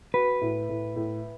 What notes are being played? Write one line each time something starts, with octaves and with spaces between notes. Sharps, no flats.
F#4 B4
A2
A2
A2